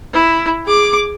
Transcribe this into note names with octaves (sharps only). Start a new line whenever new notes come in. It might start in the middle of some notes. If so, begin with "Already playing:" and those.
E4
G#4 D6